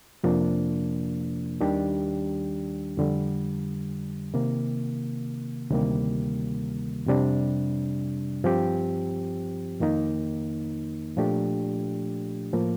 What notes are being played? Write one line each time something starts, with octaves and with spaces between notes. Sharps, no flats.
F2 C3 F3 A#3 D4
D#2 D#3 G3 D4 G4
F2 D3 G3
C3 D#3 A#3
D2 C3 D#3 G3 A#3
F2 C3 G3 D4
G2 F3 C4 G4
F2 D#3 A#3 D#4
A#2 F3 A3 D4 G4
A2 F3 A#3